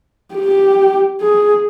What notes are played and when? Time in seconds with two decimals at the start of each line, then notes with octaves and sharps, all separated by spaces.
0.34 G4
1.21 G#4